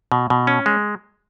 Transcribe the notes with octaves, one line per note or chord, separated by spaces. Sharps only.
B2
B2
C#4
G#3